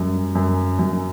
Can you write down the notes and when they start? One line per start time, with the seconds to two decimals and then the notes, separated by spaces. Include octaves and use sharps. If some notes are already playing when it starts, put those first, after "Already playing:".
Already playing: F#2 G3
0.35 F#2
0.79 F#2